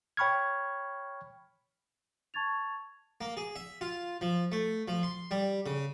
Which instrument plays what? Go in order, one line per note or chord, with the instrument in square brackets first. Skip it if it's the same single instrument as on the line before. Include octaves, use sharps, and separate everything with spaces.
[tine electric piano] C#5 G5 B5 C#6 F6 G#6
[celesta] A5 C#6 G#6 A6 F7
[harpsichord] A#3
G#4
E5
F4
F3
A3
F3
C6
G3
C#3